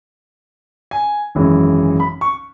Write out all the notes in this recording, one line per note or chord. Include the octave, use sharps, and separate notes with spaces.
G#5
G#1 F#2 E3 G#3
B5
C#6